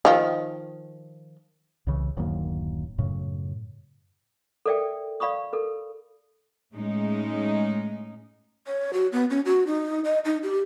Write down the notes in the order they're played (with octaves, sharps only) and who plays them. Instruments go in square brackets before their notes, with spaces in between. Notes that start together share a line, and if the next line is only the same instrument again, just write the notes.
[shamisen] D#3 F3
[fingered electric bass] C2 C#3 E3
D1 F#2 D#3 A#3
F#2 A2 C#3
[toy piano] A4 A#4 D5 E5 G5
D5 F5 B5 C#6 D#6
A4 A#4
[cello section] A2 G#3 C#4 D#4
[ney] C#5
F#4
B3
C#4
F#4
D#4
D#5
D#4
G4